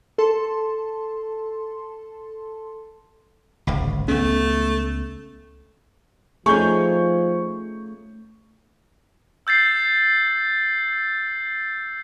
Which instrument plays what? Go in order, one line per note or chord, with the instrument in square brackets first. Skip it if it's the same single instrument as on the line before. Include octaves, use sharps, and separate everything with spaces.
[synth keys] A4 A5 C6
[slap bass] D1 G#1 C#2
[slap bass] C#2 B3 C#4 [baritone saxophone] A3
[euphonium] F3 [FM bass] A3 [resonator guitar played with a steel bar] C#4 D#4 G#4 [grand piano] C#6 G6
[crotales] E6 G6 A6 C7